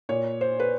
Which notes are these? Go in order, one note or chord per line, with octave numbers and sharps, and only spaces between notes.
A#2 C#5
C5
B4